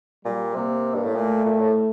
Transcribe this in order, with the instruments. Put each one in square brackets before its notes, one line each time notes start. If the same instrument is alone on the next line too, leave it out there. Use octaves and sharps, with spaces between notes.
[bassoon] A#2 [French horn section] G3
[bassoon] C3 [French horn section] A#3
[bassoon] G2
A2
[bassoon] A#2 [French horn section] A3
[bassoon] A#2
A2